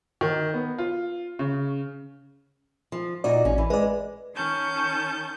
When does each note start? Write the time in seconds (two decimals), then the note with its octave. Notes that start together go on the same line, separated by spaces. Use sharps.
0.21 D#3
0.54 B3
0.78 F4
1.39 C#3
2.92 F3
3.24 A#2 D#4 F#4 D5
3.45 A1 C#4
3.58 E3
3.70 G#3 B4 D5
4.34 D#3 C#4 A5 G6